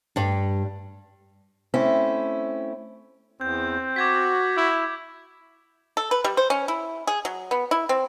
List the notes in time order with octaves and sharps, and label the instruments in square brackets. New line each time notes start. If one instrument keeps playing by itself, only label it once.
[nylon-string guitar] G2 G3
[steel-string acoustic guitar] A3 C4 C#4 E4
[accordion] E2 [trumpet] C4 [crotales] G6
[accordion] F#4 [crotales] D6 G#6 B6
[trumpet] E4
[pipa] A4
B4
G3
C5
C#4
E4
G#4
F#3
B3
E4
C4